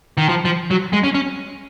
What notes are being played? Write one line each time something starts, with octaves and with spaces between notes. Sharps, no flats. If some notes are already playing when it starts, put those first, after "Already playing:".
D#3
F3
F3
F#3
G#3
C#4
C#4